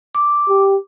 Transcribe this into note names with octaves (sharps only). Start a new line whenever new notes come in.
D6
G4